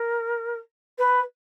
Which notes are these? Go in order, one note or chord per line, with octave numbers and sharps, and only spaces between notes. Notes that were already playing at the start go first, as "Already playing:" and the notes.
Already playing: A#4
B4